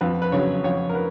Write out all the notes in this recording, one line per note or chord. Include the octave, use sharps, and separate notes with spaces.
F2 B4
B4
C#3 F#3 C#5
F2 C#5
A#4
B4